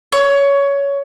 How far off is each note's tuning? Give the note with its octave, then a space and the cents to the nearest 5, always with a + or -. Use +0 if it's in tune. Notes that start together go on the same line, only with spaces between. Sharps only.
C#5 +15